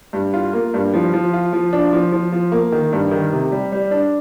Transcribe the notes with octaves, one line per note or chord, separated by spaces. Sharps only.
G2
F4
A#3
G2
F3
F3
F4
F3
D4
F3
F3
F3
A#3
D#3
G2
D#3
C3
G3
G3
D4